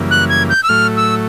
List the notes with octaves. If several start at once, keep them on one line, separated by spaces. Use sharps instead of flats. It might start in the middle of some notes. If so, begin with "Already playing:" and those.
Already playing: F#2 C#3 E3 G3 A#3
F#6
G#6
G6
E6
A2 F#3 A3 F6
E6